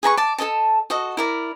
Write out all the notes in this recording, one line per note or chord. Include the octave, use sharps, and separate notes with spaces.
G#4 B4 A#5 C#6
D5 A5
A4 A#4 D#5 A5
F#4 A4 D#5
E4 A#4 D5